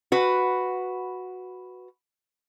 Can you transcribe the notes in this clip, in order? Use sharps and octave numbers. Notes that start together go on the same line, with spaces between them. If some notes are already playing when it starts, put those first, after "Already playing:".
F#4 B4